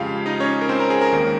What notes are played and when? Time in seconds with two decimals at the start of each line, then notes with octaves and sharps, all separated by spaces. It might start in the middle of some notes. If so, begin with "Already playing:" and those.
Already playing: F2 C#3 G#3 F4 G4 F5
0.26 D#4 D#5
0.40 C#4 C#5
0.61 A#4
0.69 C4 C5
0.80 A#4
0.90 G#4
1.01 A#4
1.12 D#2 D#3 G#3